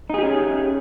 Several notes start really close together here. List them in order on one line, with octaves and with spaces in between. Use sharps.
D#4 G#4 G4 C#4